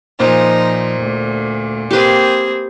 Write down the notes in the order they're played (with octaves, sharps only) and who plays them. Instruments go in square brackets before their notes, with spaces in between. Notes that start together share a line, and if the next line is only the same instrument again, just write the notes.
[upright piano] A#2 C5 [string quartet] F3 D#4
[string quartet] D2
[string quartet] A#3 C4 G#4 [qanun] G4 B4